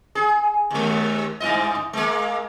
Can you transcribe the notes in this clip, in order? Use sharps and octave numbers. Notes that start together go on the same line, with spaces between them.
G#4
D#2 G#3
G2 E4 D#5
G#3 A#3